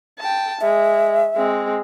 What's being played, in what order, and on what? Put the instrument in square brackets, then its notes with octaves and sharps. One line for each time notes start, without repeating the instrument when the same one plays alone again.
[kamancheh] G5 A5
[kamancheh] G#3 [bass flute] E5
[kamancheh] G#3 C4